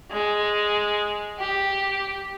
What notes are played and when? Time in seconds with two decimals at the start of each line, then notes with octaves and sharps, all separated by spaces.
0.11 G#3
1.39 G4